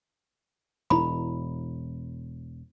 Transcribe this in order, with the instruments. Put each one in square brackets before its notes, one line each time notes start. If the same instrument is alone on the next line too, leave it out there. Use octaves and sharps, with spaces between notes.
[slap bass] E1 [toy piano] E4 A#5 B5